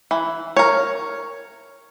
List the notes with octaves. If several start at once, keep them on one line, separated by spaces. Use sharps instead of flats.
E3
A#4 C#5